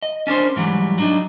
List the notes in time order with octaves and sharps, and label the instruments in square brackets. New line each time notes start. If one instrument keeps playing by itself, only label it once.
[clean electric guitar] D#5
C#4 D4 A#4 C5
G#2 E3 F#3 G3
F#3 D4 D#4